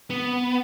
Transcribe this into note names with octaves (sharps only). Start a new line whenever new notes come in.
B3